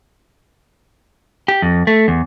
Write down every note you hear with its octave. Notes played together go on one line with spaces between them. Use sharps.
G4
F2
A3
E2